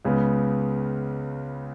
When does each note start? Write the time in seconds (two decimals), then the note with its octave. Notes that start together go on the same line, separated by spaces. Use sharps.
0.05 C#2 C#3 B3